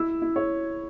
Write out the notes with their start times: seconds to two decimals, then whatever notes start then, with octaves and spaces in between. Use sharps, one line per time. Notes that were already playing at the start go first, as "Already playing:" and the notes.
Already playing: E4 E6
0.22 E4
0.36 C#5